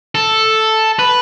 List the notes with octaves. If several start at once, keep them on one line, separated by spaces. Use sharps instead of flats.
A4
B4